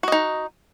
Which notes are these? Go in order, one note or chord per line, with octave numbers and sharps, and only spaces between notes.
D#4 F#4 D#5